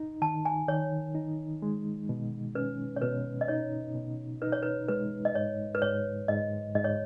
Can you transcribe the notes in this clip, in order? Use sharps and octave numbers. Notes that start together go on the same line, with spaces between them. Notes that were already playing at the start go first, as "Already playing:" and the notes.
Already playing: D#4
D#3 A5
G#5
D#3 C#5
D#4
G#3
B2
C#4 B4
C#5
B2 B4
D#5
D#4 C#5
B2
D#4 B4
C#5
B4
G#3 B4
D#5
G#2 C#5
B4
G#2 C#5
G#2 D#5
G#2 D#5
C#5